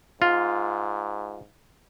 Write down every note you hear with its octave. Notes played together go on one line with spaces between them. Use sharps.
G#2 F4